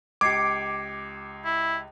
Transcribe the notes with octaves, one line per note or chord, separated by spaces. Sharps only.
C#2 G4 D6 G#6 C7 C#7
E4